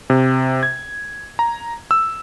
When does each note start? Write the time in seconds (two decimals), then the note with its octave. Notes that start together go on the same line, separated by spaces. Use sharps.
0.10 C3
0.63 G#6
1.39 A#5
1.91 E6